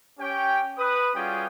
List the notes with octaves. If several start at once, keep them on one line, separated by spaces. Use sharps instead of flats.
C#4 G4 C#5 G5
B4 D#6
G3 C#4 F4 F#4 G#4 G5